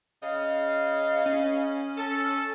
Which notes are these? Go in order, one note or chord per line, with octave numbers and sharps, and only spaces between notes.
C#3 D#5 F5
C#4
A4